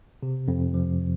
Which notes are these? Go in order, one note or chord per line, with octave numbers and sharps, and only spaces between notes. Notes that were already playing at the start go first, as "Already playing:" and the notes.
C3
F2
F3